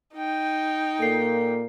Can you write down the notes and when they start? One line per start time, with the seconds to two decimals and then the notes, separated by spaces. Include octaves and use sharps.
0.15 D#4 G5
1.00 A#2 A#3 A4 C7